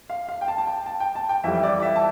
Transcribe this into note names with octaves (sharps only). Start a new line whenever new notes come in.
F5
F5
G5
A5
A5
G5
A5
G5
A5
G5
F2 E3 G3 E5
D5
E5
A5